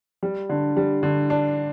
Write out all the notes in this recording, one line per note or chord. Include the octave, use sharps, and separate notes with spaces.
G3
D3
G3
D3
D4